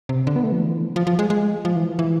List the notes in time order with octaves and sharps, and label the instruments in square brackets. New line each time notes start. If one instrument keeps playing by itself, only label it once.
[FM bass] C3
D3
B3
A3
F3
E3
F3
F3
G#3
G#3
F3
E3
E3